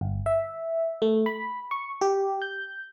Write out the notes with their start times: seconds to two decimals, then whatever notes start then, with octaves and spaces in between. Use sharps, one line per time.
0.01 G1
0.26 E5
1.02 A3
1.26 B5
1.71 C#6
2.01 G4
2.42 G6